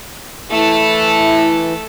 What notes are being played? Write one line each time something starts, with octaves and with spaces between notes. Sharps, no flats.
E3 A3 E4 A4